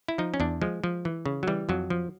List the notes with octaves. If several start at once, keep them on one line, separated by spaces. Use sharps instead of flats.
E4
F3 D#4
C#4
E2 D4
F3 G#3
F3
E3
C#3
F#3
E3 G3
F2 F#3
F3